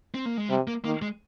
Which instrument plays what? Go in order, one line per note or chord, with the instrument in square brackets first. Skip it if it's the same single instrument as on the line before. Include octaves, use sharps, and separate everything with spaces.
[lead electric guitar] C4
A#3
G#3
[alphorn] C3 [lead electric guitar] G3
[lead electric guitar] A#3
[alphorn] D#3 [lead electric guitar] A#3
[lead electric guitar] G#3